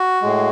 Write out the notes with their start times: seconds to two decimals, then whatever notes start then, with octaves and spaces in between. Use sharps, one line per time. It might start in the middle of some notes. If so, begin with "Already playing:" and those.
Already playing: F#4
0.22 A2 G#3